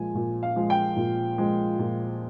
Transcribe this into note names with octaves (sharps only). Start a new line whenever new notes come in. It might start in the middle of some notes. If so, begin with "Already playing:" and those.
Already playing: A#2 F3 G#3 G#5
A#2
F5
F3 G#3
G5
A#2
F3 G#3
A#2